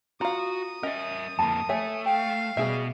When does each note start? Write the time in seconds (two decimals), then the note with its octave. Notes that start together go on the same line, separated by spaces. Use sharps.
0.21 F4 F#4 F5 A#5 D#6
0.83 C#4 A#4 D#5 E5 G5
1.39 F2 A#3 A5 B5
1.69 A3 C#5 E5 G#5
2.06 F5 G5
2.57 B2 G3 G#4 E5